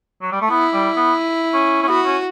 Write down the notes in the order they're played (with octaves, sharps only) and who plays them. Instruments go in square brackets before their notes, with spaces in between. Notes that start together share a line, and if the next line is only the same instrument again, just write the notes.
[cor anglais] F#3
G3
A3
[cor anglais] B3 [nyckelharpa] E4
[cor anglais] G3
B3
C#4
C#4
[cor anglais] B3 [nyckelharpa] F#4
[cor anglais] C#4